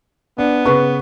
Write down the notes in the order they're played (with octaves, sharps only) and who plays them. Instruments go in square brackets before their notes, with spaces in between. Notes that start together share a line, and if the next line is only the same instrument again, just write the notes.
[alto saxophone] B3 [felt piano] D4
[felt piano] C#3 B4 C#6